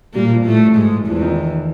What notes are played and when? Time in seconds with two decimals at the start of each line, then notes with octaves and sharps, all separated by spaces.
0.14 A#2 G3 A#3
0.30 F3
0.45 A2 A3
0.76 G#2 G#3
1.06 E2 E3 F3
1.21 D#3